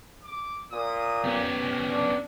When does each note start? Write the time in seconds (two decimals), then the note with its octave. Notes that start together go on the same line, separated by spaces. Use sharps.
0.23 D6
0.72 A#2 D#6
1.24 B3 C#4 G4
1.91 D4